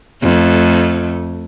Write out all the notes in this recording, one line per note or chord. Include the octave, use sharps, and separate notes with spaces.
F2 A3